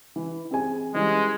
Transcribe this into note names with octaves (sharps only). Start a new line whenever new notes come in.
E3
C4 G#4 G#5
E3 G3 G#3 C#4